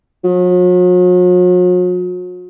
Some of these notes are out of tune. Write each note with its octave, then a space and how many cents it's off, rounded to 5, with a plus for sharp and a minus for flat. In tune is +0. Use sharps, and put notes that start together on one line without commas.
F#3 -45